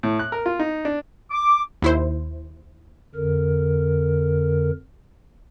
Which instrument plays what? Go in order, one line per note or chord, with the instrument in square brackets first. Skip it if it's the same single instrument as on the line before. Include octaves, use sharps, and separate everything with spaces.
[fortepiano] A2
F#6
A#4
F4
D#4
D4
[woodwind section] D6
[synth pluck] D#2 E4 C5
[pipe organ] F2 D3 A#4